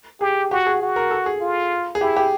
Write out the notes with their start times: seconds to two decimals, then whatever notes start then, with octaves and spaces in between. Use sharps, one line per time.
0.21 G4 G#4
0.51 F#4 G4
0.66 G#4
0.82 F#4
0.96 A#4
1.11 A4
1.26 G#4
1.41 F4
1.95 G#4
2.01 E4 G4
2.17 G4